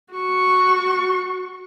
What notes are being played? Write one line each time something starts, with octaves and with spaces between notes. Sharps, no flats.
F#4 C#6